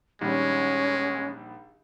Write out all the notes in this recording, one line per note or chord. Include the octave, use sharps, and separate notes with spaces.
A#1 D#3 G3 G#3 C#4